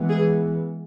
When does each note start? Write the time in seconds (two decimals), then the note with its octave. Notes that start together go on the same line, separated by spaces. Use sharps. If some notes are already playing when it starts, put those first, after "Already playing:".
Already playing: E3 G#3 B3
0.09 G#4